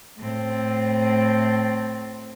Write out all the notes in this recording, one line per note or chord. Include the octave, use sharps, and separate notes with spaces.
A2 C4